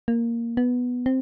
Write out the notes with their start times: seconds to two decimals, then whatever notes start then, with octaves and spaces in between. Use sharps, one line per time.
0.08 A#3
0.57 B3
1.06 C4